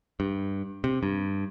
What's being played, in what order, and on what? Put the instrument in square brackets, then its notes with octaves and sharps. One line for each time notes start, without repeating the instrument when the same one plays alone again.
[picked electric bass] G2
C3
G2